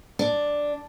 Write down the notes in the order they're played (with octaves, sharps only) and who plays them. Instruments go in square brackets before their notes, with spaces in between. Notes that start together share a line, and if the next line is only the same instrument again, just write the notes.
[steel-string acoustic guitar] D4